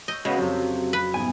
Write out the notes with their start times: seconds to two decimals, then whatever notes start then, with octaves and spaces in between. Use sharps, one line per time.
0.08 D#5 C#6 E6 G6
0.25 C#3 G#3 B3 F#4
0.38 F2 C3 F#3
0.93 B4
1.14 C2 G#2 B3 G#5